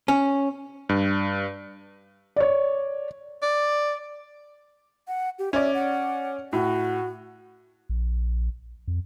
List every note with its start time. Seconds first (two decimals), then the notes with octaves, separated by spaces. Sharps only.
0.08 C#4
0.89 G2
2.36 C#5 D5
3.43 D5
5.08 F#5
5.39 G4
5.53 C#4 D5 E5
5.74 F#5
6.53 A2 F#4
7.89 A#1
8.88 F2